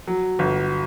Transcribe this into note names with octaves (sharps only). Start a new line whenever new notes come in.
F#3
G1